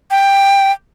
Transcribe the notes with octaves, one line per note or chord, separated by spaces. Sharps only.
G5